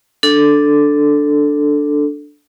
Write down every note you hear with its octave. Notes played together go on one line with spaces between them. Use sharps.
D4 A4